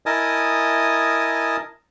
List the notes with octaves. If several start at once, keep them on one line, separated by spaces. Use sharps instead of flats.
E4 A#4 D#5 G#5 A5 D#6